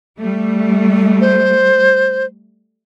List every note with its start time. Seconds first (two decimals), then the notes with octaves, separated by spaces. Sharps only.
0.20 G3 A3
1.21 C5